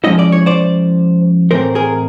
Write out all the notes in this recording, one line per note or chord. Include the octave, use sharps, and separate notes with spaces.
F3 G#3 C#4 E4 D#5
D5
C#5
C5 D5
A2 E3 A3 C4 A#4 C5
G#4 A#4